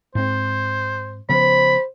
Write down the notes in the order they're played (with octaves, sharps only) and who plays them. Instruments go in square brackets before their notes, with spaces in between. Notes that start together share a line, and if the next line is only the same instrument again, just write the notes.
[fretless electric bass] G#2 C4 [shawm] C5
[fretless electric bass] C#3 F3 B3 [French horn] C5 [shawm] B5